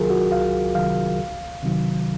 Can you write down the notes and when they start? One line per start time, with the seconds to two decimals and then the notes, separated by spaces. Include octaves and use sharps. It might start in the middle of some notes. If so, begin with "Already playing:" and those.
Already playing: C2 C3 D#3 F#3 F4 G#4 A#4
0.10 F#4
0.32 C2 F5
0.75 C3 D#3 F#3 F5
1.19 C#2
1.63 C3 D#3 F#3